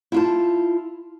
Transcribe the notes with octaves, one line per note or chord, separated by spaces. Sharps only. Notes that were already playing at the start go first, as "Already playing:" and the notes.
E4 F4 A5